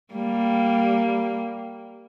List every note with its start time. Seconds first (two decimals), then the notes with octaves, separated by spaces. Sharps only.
0.14 G3 A#3